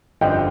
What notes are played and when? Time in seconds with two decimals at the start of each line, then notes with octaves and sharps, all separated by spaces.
0.21 G1 F2 D3 F3 D#5 G5